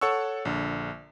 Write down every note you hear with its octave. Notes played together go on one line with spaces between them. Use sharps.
A4 C#5 F#5 C#6 E6
A#1 D3